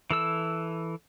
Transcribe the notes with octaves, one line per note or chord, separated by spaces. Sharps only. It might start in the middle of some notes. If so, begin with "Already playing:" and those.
E3 A4 E6